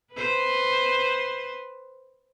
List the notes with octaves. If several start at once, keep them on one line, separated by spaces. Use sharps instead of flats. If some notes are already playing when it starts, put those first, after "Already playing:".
B4 C5